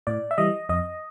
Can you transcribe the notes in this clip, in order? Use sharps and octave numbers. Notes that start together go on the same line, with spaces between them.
A2 D5
E5
E3 G3 D#5
F2 D#5